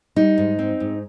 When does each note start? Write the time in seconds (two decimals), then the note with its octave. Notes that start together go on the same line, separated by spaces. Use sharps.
0.16 G3 D#4
0.38 G#2
0.59 C4
0.80 G#2